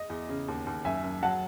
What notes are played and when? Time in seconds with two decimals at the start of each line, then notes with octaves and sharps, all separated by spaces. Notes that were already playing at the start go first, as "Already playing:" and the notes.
Already playing: D#5
0.10 E2
0.29 C#3
0.48 D#2
0.67 D#2
0.85 F#2 E5 G#5
1.03 F#2
1.22 F#3 F#5 A5